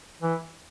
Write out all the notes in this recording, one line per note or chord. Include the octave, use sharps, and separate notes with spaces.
E3